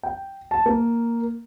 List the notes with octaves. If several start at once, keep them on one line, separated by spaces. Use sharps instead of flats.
G5
A5
A#3